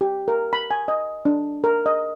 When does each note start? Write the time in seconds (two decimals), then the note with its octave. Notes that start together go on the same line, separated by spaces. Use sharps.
0.01 G4
0.28 A#4
0.53 B5
0.71 G#5
0.88 D#5
1.25 D4
1.64 A#4
1.86 D#5